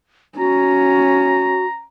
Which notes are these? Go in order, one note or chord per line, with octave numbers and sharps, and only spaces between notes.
C#4 F#4 A#5